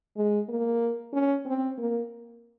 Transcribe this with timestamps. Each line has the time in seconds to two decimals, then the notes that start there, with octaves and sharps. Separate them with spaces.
0.16 G#3
0.48 A#3
1.13 C#4
1.46 C4
1.77 A#3